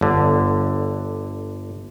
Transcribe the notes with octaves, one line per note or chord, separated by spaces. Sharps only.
G1 D3